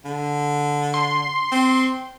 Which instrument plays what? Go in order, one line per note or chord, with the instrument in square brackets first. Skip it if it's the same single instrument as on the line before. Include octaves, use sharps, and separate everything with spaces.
[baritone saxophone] D3
[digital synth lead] C6
[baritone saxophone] C4